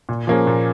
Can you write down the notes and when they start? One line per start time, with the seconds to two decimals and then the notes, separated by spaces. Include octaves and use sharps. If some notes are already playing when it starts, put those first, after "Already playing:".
0.09 A#2
0.27 F3 A#3 C#4 G#4
0.47 A#2